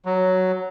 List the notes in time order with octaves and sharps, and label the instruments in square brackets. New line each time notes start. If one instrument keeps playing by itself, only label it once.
[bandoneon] F#3